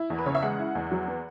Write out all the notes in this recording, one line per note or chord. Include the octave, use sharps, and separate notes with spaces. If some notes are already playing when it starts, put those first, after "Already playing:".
Already playing: E4
E2
B4
C#3 C#5
E5
G#3 F#5
E4
E2
F#3
B3